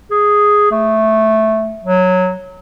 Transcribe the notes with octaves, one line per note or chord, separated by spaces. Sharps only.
G#4
A3
F#3